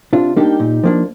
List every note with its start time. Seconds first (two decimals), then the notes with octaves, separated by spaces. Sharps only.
0.13 C3 D4 F4
0.36 G3 A#3 D4 D#4 G4
0.60 A#2
0.83 F3 A#3 D4